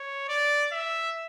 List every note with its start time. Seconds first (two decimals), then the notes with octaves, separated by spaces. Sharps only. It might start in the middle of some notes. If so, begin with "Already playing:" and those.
Already playing: C#5
0.28 D5
0.72 E5